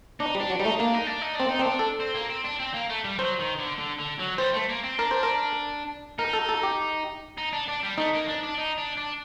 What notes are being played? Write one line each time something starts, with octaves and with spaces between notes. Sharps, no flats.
D4 D#4
G3
D4
F#3
G3 D#4
A3
A#3 D4
D#4
D4
D#4
D4
C4
D#4
C4 D4
A4
C4
A#3
C4
D4
C4
A#3
A3
G3
F#3 C5
D#3
D3
D3
D3
F#3
G3 C5
A3
A#3
C4
D4 A#4
C5
A#4
D#4 A#4
A4
A4
G4
D#4
D4
D4
G3
A3 D#4
A#3
D4
D4
D#4
D4
D4